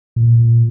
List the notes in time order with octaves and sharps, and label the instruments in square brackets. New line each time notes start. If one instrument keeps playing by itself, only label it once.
[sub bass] A#2